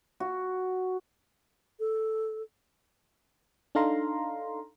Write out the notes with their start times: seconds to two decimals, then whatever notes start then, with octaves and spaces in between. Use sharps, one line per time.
0.20 F#4
1.80 A4
3.75 D4 D#4 A4 F5 A#5 C6